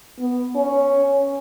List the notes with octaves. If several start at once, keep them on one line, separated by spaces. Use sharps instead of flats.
B3
C#4